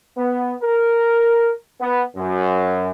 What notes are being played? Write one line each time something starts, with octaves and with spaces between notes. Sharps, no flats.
B3
A#4
B3
F#2